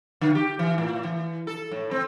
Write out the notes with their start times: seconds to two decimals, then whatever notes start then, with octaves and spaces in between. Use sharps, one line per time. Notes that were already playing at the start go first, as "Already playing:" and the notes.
0.21 D3
0.35 G4
0.59 E3
0.78 A2
1.04 E3
1.47 A4
1.72 A2
1.91 C4